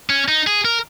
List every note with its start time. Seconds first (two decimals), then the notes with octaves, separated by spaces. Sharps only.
0.10 C#4
0.28 D#4
0.47 G#4
0.65 A#4